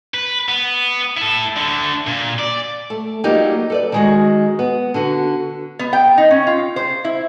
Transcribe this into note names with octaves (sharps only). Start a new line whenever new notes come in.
B4
B3
E4 A4
D3 A3
A#2
D5
A3
F#3 G3 A#3 D#4 F4 G4
A4 B4 D5
D#3 G#3 F#4
B3
D3 F#4
B3
G5
D#4
C#4
F4
C5
E4